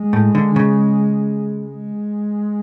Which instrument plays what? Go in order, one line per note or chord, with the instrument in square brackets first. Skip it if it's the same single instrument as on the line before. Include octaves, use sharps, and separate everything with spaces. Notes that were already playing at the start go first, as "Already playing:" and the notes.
Already playing: [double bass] G#3
[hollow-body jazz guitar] A2
D3
C#3
[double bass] G#3